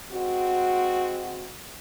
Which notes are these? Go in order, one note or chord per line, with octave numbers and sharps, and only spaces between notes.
G#3 C4 F#4